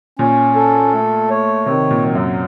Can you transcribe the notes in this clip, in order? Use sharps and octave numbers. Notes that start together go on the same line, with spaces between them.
A#2 C#4
A4
A3
C#5
C3 D#3
A#2
F#3
F#2